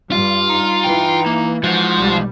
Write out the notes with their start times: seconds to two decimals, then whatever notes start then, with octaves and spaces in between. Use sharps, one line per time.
0.11 G2 G3 F4
0.49 D#4
0.84 E3 G5
1.26 A#3
1.64 F3 G#3 D#4 F#4
1.96 B1 G3